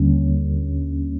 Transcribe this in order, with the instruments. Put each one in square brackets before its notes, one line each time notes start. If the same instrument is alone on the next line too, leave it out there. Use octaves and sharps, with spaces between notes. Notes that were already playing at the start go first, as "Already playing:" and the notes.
Already playing: [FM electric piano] D#2 D3 G3 A#3 C#4